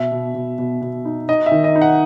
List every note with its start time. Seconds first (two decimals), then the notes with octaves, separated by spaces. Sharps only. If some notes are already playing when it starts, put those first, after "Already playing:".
Already playing: B2 E5
0.12 B2
0.34 B2
0.58 B2
0.82 B2
1.05 D#4
1.29 D#4 D#5
1.46 E5
1.52 D#3
1.64 D#5
1.75 D#4
1.82 F#5